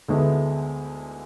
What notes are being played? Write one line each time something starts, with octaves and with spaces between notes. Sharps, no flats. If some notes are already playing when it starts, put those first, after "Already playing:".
D2 D3 G#3 B3 E4